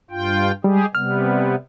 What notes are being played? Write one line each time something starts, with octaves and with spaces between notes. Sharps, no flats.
G2 F4 G5
G3 G#3 G4 G#4
C3 G3 B3 F6